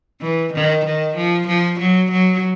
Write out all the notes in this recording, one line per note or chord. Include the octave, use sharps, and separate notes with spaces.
E3
D#3
D#3
F3
F3
F#3
F#3